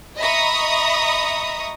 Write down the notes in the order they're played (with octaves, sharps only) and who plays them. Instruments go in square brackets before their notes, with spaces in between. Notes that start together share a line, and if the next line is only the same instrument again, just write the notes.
[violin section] D#5 E5 A#5 B5 C#6 D#6